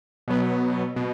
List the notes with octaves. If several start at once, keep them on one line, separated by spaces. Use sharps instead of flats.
B2 F#3 B3
B2